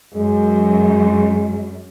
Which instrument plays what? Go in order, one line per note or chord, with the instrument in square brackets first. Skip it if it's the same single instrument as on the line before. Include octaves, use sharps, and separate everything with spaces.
[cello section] F#2 [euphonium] G#3